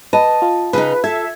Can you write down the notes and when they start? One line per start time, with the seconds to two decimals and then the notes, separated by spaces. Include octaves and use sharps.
0.13 B4 D#5 A5
0.42 F4
0.73 C#3 D#4 B4
1.04 A4 E5 G#6